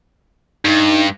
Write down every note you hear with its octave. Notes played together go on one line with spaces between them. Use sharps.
G2 D#4